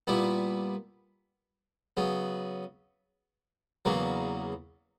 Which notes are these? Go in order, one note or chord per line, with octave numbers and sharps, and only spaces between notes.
A#2 G3 B3 E4
C#3 F#3 B3
E2 C#3 F#3 A#3